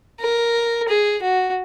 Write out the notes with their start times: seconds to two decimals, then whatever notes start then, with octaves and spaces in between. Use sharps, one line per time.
0.20 A#4
0.88 G#4
1.22 F#4